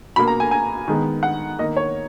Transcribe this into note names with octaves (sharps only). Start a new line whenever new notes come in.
B2 A#3 B5
A#5
G#5
G#5
D#3 G#3 B3
F#5
D#3 A#3 D#5
C#5